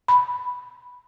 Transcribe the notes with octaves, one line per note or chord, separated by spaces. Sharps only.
B5